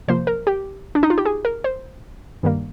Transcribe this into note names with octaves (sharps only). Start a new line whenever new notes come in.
C3 F3 A#3 C5
A#4
G4
D4
D#4
F4
G4
G#4
A#4
C5
G2 D#3 G3 A#3